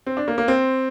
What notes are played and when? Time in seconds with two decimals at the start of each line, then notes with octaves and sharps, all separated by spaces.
0.07 C4
0.17 D4
0.28 A#3
0.38 A#3
0.48 C4